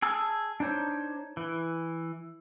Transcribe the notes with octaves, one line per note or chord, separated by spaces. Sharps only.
G#4 A5 E6
D4 D#4 C5 C#5
E3